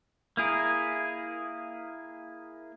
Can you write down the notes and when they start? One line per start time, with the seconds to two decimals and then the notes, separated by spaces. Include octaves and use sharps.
0.37 A#3 E4 G#4 A#4